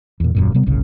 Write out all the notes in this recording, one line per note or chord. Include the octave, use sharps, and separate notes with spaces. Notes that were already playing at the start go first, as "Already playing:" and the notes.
E2 A#2
D#1 F#2 A#2
C3 G3 B3
G1 C2 A#2 C#3